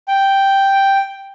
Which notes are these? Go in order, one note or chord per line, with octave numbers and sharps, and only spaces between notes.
G5